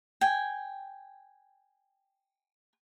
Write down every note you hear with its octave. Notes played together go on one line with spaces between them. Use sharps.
G5 G#5